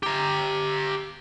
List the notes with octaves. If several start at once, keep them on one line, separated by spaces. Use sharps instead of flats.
G4 A#5